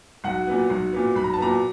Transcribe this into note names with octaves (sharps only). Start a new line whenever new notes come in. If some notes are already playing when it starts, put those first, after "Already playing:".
B1 F#5
A#2 F#3 B3
B1
A#2 F#3 B3
B1 B5
A#5
A5
A#2 F#3 B3 A#5